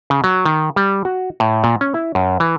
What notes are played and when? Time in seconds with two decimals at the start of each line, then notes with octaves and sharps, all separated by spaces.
0.10 C#3
0.24 F#3
0.45 D#3
0.76 G3
1.05 F#4
1.40 A2
1.64 A#2
1.81 C#4
1.94 E4
2.15 F#2
2.40 E3